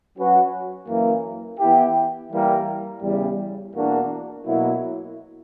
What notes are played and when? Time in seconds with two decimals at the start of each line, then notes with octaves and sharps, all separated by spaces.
0.17 F#3 C#4 F#4 B4
0.88 F#2 E3 A#3
1.60 E3 B3 E4 G4
2.31 E3 G3 A#3
3.03 E2 C#3 G3
3.75 E2 B2 A#3 D4 F#4
4.47 B2 F#3 A#3 E4